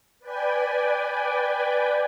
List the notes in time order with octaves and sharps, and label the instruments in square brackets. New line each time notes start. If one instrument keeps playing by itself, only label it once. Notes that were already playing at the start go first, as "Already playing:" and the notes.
[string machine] B4 D5 G5 G#5